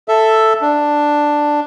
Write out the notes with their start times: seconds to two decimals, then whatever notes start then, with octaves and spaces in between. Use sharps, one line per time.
0.08 A4 E5
0.62 D4